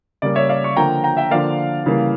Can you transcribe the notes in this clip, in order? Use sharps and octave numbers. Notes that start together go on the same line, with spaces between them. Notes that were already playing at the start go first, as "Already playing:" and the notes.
C#3 G3 A#3 D5
C#5 E5
D5 F5
C#6
D3 F3 A#3 G5 A#5
G5 A#5
E5 G5
D3 F3 A#3 D5 F5
C#3 E3 G3 A#3